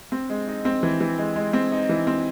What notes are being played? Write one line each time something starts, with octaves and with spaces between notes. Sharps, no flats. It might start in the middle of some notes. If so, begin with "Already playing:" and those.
C4
G#3
D#4
C4
E3
E3
G#3
G#3
C4
D#4
E3
C4